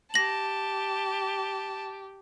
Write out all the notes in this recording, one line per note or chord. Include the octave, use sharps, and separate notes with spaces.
G4 A5 A#6 F#7